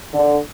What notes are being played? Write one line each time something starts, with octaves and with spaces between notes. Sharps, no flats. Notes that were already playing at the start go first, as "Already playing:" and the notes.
D3